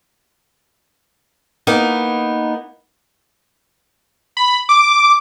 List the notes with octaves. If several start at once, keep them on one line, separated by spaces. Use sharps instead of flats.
A#3 B3 D#4
B5
D6